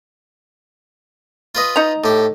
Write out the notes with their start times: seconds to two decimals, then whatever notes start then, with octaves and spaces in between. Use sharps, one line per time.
1.55 F4 B4 D#5
1.76 D#4 A#5
2.04 A2 G4